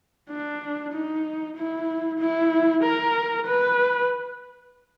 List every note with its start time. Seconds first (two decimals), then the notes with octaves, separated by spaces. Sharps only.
0.30 D4
0.94 D#4
1.56 E4
2.19 E4
2.83 A#4
3.46 B4